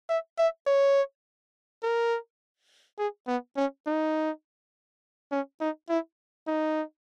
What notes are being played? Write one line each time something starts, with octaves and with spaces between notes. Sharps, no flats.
E5
E5
C#5
A#4
G#4
B3
C#4
D#4
C#4
D#4
E4
D#4